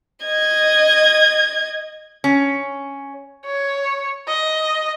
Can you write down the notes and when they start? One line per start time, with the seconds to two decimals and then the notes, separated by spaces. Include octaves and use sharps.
0.25 D#5 G#6
2.24 C#4
3.46 C#5
4.27 D#5